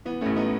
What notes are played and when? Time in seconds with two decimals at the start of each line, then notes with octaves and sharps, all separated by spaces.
0.05 E3 B3
0.21 A1 A3 C#4
0.36 B3 D#4